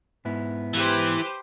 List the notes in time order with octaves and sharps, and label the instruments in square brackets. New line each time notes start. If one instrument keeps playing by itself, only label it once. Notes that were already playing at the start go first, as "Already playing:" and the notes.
[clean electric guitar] G#2 B3 E4
[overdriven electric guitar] E3 [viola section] G4 B4 C5